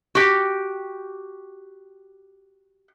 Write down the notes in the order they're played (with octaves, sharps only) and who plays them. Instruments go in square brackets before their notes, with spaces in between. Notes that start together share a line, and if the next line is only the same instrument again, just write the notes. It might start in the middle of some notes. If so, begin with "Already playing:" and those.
[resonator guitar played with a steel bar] F#4 G4